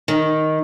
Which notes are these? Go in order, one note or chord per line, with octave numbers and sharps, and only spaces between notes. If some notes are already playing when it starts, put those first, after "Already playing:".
D#3